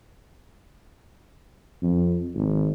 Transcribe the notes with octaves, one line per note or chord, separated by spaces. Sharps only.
F2
G#1